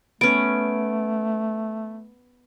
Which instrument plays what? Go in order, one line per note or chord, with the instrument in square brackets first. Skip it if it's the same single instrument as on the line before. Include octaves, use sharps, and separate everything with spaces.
[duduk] A3 [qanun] B3 C#4 [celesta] D7